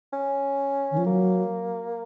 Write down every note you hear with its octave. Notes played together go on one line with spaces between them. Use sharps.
C#4
D#3
F3
F#3 A#3